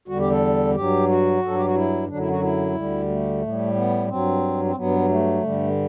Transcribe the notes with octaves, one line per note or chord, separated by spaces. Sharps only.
E2 D3 G3 F#4
G4
A4
G2 F#3 G4
F#4
G2 F#3 A4
G4
F#4
E4
F#2 D3 F#3 D4
E4
F#4
E4
D2 D3 G3
A3
A2
G3
B3
G2 F#3 C4
C4
G2 F#3 B3
A3
G2 D3 G3